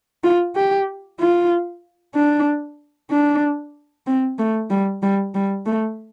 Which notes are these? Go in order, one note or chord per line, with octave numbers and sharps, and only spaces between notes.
F4
G4
F4
D4
D4
C4
A3
G3
G3
G3
A3